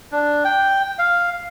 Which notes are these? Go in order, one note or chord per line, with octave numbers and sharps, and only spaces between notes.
D4
G5
F5